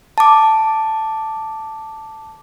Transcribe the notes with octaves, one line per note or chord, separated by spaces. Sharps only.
A5 D6